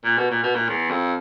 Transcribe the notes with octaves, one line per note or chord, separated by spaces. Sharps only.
A#2
B2
A#2
B2
A#2
E2
F2